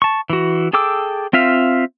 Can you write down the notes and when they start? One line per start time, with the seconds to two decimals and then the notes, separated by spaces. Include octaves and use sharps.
0.02 A5 C#6
0.30 E3 F#4
0.73 G#4 A4 G5 D6 E6
1.33 C4 F4 E5 F5